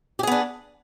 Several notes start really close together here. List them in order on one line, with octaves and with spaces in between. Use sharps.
G4 G#4 B3 D4